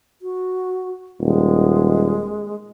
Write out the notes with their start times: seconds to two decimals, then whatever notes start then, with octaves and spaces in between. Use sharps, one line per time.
0.22 F#4
1.20 D#1 G#3